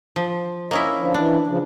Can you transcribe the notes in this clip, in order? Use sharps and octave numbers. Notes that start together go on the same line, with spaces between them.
F3
A#3 C#4 E4 D#5
D3 F3
E3 D4
C#3 F3